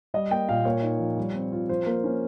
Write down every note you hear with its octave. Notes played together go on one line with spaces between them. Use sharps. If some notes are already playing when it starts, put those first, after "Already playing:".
G3 D#5
A#3 G5
A#2 F5
A#3 C#5
D#4
F3
G3
C4
F4
F3 C5
A#3
C#4